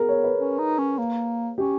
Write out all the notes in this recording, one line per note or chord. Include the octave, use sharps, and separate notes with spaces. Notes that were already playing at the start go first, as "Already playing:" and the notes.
Already playing: B3 G#4 A#4
C#5
B4
C#4
D#4
C#4
A#3
C#4 G4